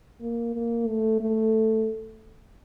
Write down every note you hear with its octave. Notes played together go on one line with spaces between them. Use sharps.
A#3
A#3
A3
A3